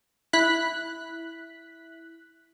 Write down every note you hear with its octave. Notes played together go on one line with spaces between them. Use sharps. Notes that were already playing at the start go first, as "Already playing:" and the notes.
E4 F#6 B6